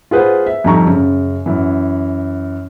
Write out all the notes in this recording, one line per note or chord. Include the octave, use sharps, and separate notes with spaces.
F4 G#4 B4 C5 F#5
E5
F2 D3 G3 D#4 A#5 C#6
F#2 C#3
F#2 E3